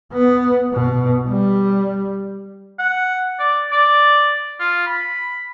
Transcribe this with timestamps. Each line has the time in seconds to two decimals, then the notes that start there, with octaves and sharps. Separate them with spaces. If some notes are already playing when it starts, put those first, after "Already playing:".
0.12 B3
0.73 B2
1.28 G3
2.79 F#5
3.39 D5
3.72 D5
4.60 F4
4.87 B5